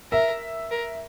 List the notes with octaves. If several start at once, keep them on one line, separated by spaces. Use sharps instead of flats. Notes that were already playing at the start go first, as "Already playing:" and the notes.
A#4 E5
A#4